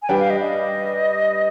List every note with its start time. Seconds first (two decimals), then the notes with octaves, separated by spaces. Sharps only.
0.02 G#5
0.09 G3 D4 G4 B4 G5
0.19 F5
0.30 D#5
0.41 D#5